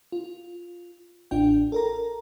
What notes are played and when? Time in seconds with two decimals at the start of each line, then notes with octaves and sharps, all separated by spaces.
0.12 F4
1.31 A1 D4 F4 G5
1.72 A4 A#4 A#5